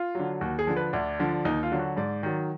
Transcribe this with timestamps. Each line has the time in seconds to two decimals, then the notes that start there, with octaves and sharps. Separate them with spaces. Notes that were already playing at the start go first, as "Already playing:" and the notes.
Already playing: F4
0.15 D3 F#3
0.41 D#2 F#4
0.59 G#4
0.67 D3 F3
0.77 B4
0.93 D2 D4
1.19 D3 F3
1.45 D#2 D#4
1.63 F4
1.71 D3 F#3
1.79 F#4
1.97 G#2 D5
2.23 D#3 F#3